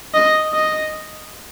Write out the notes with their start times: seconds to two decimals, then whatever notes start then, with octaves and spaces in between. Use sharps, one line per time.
0.14 D#5
0.53 D#5